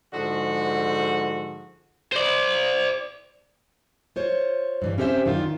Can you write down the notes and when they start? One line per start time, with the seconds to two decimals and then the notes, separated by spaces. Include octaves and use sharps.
0.13 G#2 D3 F3 F#4
2.12 C5 D5
4.16 F4 C5 C#5
4.82 G2 E3 G3
4.98 C4 C#4 G4 A#4 C5 E5
5.25 F#2 D#3 D4 F4